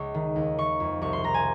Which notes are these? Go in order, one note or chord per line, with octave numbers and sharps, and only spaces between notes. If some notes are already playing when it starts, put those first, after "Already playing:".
Already playing: C#2 C#6
D#3
D#2
D#3 C#6
F2
C2 C#6
C6
C2 A#5
G#5